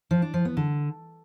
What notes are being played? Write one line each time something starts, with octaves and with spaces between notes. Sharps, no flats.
F3
D4
F3
B3
D3